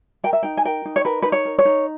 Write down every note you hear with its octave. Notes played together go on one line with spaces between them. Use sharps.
A#4 G5
E5
D#4 G5
G#5
A#4 G5
D#4
C#5
A#4 B4
D#4 B4
C#5
A#4
C#5
D#4